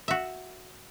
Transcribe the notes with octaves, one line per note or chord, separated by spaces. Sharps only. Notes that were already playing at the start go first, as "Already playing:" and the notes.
F#4 E5